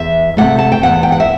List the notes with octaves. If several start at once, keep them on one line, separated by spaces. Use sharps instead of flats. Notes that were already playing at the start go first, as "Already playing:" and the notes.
Already playing: E2 E5
C3 E3 A3 F#5
A5
G5
E2 F#5
G5
F#5
E5